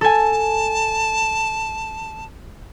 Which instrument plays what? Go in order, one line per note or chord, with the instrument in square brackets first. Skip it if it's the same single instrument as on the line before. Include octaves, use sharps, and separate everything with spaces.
[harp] A4 G#5 [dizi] A5